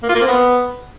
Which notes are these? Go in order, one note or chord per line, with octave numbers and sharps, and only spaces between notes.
A#3
F4
A#3
C4
B3